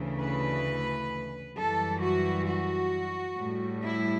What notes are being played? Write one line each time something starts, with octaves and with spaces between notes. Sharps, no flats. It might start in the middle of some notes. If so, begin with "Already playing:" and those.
Already playing: D2 C#3 E3
B4
F#2 E3 G3 A4
F#4
F#4
A2 G3
E4